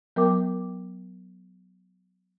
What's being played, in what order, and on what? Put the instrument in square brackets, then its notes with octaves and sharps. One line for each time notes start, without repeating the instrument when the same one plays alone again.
[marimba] F#3 B3 A#4 G5 D6